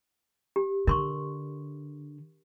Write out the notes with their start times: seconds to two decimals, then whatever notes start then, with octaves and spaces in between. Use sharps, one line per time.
0.56 G4
0.87 D3 A#4 C6 C#6